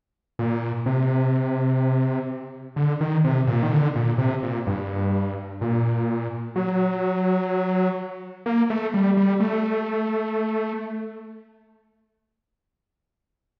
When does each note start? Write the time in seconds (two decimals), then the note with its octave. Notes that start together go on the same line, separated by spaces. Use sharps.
0.39 A#2
0.86 C3
2.76 D3
3.01 D#3
3.24 C3
3.47 A#2
3.63 D#3
3.71 D3
3.96 A#2
4.18 C3
4.42 A#2
4.67 G2
5.61 A#2
6.56 F#3
8.46 A#3
8.70 A3
8.94 G3
9.17 G3
9.40 A3